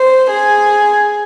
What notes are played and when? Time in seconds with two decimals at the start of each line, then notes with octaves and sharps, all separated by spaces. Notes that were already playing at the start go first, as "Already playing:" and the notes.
Already playing: C5
0.30 G#4